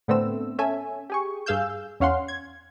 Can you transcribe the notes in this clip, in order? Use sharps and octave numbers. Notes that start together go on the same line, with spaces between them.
A2 D3 A3 B3 C4 E6
C#4 A4 E5 G#5
G4 G#4 C#6
G2 G#4 F5 E6 G6
E2 C#4 F5 F#5 C6
G#6